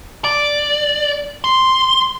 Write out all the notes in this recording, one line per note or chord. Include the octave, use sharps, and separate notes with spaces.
D5
C6